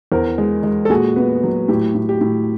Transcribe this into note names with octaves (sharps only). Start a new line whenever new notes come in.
E2 A#4 C5
G#3
G#3
A4
A#2 F#4 G#4
B3
F#3
A2 G4
A2
G4
A2